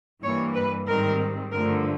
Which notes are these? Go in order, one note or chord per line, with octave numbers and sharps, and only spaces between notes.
G2 E3 G3 A#3 C#5
B4
G#2 D#3 G3 C4 A#4
G2 D3 F3 A3 A#4